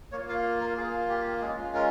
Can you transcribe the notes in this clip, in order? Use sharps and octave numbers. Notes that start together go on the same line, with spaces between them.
A#3 F4 C#5
F5
A#4
A#3 F4 G#4
G4
G#3 C#4 F4 G#4
A#4